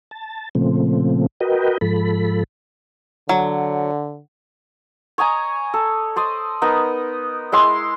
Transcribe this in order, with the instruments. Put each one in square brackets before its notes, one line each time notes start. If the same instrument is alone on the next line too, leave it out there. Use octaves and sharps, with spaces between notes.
[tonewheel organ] A5
A#2 C#3 F3 A3 C4
F#4 A#4 B4 D#5 G5
G#2 F3 A4 B5
[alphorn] D3 [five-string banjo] F#3
[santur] C#5 D#5 G#5 A#5
A4
C5 D5 D#5
B3 D#4 A#4 D#5
G#3 E4 C6 D6